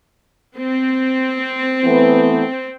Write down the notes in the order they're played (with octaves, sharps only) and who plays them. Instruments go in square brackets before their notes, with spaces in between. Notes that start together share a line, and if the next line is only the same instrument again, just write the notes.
[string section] C4
[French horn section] E3 A3 B3